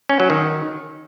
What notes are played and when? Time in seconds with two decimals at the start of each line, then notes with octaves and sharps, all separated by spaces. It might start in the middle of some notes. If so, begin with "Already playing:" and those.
0.09 C#4
0.20 F#3
0.30 D#3